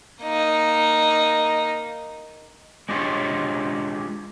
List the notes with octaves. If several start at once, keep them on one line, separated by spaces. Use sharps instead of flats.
A#3 D#4
G#3 D4 F4 G4 C#5